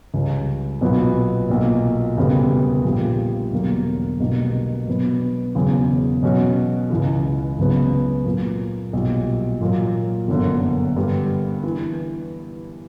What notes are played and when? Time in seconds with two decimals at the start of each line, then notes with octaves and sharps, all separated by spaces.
0.14 C#2 C#3 G3 C#4
0.81 B1 A#2 F#3 B3 F#4
1.49 B1 A#2 A#3
2.17 E1 D2 C#3 G3 B3
2.85 A#1 A#2 G3
3.52 E1 E2 D3 F#3 A#3
4.20 B1 B2 G3 A#3 D4
4.87 B2 F#3 B3 D4
5.55 E1 E2 C#3 F#3
6.23 B2 F#3 C#4 F#4
6.90 C#2 C#3 E3
7.58 C#2 C#3 F#3 B3
8.25 A#2 F#3 A#3
8.93 B1 A#2 G3
9.61 A#2 F#3 A#3
10.28 G1 F#2 D3 A#3
10.96 G2 D3 G3
11.64 E3